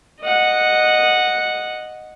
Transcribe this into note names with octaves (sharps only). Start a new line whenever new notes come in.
D#5 F#5